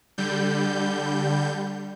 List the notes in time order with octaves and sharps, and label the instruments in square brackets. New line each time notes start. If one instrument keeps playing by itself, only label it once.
[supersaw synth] D3 G3 G6